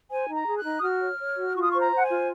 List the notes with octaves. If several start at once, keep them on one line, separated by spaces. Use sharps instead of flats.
C5 G#5
D#4
A#5
G#4
F#6
D#4
D#6
F#4 F6
C#5
C#5
F#4
F4 C#6
D#6
C5 C#6
A#5
C5 F#5
G#5
F4